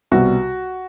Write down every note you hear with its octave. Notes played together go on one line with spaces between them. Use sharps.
C2 B2 G3 F#4